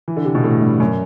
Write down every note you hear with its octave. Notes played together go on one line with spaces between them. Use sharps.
E3
D3
C3
B2
A2
G2
F#2